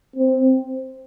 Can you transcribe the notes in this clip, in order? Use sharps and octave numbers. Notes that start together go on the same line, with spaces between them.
C4